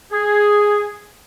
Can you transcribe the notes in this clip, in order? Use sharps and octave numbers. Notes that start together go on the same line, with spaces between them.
G#4